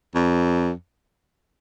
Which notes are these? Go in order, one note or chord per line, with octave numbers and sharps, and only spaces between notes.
F2